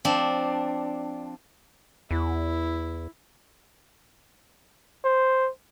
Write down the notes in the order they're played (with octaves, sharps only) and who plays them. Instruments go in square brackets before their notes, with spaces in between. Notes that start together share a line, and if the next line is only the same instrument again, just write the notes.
[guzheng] F3 C4 D4
[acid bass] E2 [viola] E4
[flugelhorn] C5